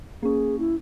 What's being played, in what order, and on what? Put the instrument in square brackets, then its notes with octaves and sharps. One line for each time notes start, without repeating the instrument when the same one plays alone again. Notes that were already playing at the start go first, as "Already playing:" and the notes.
[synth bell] A#3 C#4 [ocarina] G#4
[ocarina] E4